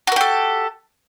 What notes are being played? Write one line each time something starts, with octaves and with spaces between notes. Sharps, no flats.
F#4 G4 A4 A#4